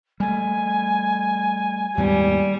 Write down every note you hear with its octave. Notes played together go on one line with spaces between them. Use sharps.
G3 A3 G#5
D#2 G#2 G3 B3